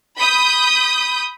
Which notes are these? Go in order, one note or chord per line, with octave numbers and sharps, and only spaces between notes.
B5 D#6 G6